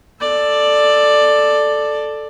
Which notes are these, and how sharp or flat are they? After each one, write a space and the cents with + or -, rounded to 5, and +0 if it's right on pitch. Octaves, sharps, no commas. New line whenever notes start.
A4 +0 D5 +10